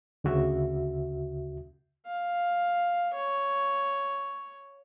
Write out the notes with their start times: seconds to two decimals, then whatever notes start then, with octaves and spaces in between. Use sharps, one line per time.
0.24 D2 C#3 F#4 E5
2.06 F5
3.13 C#5